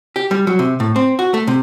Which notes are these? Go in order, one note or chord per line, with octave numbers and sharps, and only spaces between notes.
G4
G3
F#3
C3
A2
C4
F#4
A3
C3